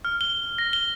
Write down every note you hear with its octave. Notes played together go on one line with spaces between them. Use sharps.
F6
G7
A#6
G7